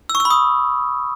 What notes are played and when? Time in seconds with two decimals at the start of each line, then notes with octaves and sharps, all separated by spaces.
0.09 E6
0.15 C#6
0.20 E6
0.25 B5
0.30 D#6